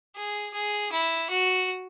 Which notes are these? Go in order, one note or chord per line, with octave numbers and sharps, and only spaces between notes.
G#4
G#4
E4
F#4